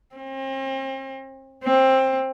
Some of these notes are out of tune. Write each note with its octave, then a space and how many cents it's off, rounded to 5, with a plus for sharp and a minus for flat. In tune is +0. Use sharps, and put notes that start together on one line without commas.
C4 +40
C4 +15